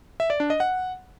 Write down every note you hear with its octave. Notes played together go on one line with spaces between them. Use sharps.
E5
D5
D4
D#5
F#5